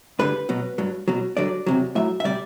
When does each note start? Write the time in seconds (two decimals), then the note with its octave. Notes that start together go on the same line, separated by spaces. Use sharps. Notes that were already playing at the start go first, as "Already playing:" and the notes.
0.19 G2 D3 G3 B4
0.49 B2 F#3
0.78 G2 F#3
1.08 B2 F#3
1.37 G2 D3 F#3 D5
1.66 E2 C3 F#3
1.95 A2 F#3 E5
2.20 E5
2.24 C3 G3 D5